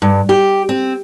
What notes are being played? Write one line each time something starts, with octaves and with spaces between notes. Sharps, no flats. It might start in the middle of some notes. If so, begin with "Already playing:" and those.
G2
G4
C4